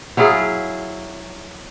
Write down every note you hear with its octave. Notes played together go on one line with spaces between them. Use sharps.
F#3 E4 F4 G#4